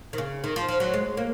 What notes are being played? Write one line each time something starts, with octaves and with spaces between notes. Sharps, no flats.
D#3
C#3
D#3
F3
F3
F#3
G#3
A#3